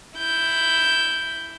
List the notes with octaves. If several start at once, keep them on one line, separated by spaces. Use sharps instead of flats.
E4 G6